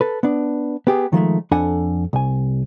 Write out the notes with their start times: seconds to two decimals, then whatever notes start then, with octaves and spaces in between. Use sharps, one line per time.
0.01 A4 B4
0.23 B3 D4
0.87 B3 G4 G#4
1.13 D#3 F3 G#3 A3
1.51 F2 D4 A4 F#5 G#5
2.13 C2 G#5